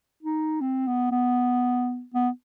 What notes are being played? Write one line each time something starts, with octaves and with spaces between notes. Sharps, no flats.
D#4
C4
B3
B3
B3